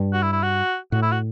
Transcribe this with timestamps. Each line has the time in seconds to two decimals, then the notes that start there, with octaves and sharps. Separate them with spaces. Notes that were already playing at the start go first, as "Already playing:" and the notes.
Already playing: G2
0.13 F#4
0.22 E4
0.32 E4
0.42 F#4
0.92 A2 F#4
1.02 E4
1.12 F#4